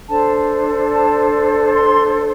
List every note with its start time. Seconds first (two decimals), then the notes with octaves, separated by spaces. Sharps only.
0.07 D4 A4 C5 A5
0.91 A5
1.67 A5
1.74 C6